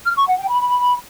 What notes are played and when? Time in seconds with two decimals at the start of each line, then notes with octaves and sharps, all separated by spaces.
0.05 F6
0.16 C#6
0.27 F#5
0.39 G5
0.50 B5